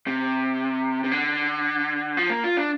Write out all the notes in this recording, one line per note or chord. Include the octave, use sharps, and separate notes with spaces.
C3
C3
D3
F3
A#3
F4
D4